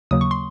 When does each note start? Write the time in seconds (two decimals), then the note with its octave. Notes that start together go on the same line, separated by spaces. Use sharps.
0.11 D#2 C#3 F#3 A#3 D#6
0.21 C#6
0.31 C6